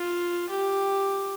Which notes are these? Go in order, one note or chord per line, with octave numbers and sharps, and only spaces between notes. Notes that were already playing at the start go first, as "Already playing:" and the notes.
Already playing: F4
G4